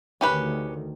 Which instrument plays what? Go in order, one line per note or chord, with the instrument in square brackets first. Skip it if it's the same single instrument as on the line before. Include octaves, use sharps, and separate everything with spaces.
[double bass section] D2 D#3 [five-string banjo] C#4 G4 B4